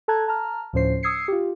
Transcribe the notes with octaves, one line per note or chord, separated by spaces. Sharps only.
A4 A5 A#5 F#6 G#6
A5 A#5 F6
D2 A2 F3 C#4 C5 C7
D#6 E6 G#6 C7 C#7
F4 G4